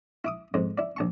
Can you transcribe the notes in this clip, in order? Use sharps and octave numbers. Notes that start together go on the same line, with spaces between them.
E4 D6 D#6
F2 G#2
E4 D5
A#1 A5 C#6